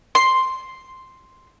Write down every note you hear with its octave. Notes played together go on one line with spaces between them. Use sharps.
C6